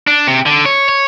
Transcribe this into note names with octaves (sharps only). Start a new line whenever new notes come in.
D4
C3
D3
C#5
C#5